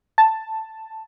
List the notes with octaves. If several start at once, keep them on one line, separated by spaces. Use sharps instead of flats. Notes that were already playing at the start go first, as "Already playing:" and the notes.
A5